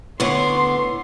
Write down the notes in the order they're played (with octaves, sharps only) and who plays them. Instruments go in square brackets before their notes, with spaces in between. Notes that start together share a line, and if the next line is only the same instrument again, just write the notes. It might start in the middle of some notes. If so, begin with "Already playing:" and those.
[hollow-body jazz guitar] A2 B4 C#5 [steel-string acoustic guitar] D3 B3 [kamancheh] C6